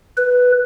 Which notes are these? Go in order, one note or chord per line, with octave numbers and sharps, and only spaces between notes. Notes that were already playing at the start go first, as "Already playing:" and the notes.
B4